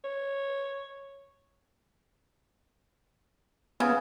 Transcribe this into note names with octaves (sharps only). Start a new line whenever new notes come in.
C#5
C#3 B3